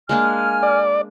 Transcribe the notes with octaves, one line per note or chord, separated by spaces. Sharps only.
G#3 A#3 D4 G#5 F6
D5